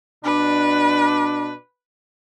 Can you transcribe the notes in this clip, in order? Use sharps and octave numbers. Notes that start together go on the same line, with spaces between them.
B2 D4 B4